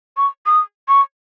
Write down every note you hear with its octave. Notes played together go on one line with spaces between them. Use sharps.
C#6
D#6
C#6